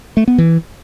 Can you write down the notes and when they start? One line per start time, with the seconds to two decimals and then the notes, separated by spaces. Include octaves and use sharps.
0.17 A3
0.28 B3
0.38 E3